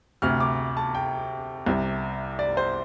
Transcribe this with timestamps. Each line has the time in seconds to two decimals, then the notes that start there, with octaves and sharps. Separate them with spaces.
0.22 D2 C3 F6
0.40 D6
0.77 A5
0.95 G5
1.66 C2 C3
2.39 D5
2.57 C5